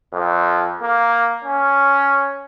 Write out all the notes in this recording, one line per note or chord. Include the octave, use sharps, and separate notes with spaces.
F2
A#3
C#4